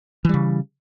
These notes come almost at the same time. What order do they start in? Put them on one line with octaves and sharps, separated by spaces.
E3 G3 C#3